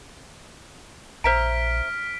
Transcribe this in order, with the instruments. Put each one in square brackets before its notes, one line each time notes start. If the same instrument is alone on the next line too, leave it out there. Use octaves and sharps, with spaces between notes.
[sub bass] A#1 [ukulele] C5 E5 A#5 [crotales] F6 B6 D7